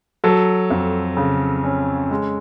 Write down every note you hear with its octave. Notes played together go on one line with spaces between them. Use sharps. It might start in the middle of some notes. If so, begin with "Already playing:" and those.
F#3 A4
F2
C#3
C#4
G#3